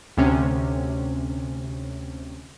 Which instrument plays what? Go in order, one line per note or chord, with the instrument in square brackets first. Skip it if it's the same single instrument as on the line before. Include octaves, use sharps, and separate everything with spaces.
[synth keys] D2 C3 C#4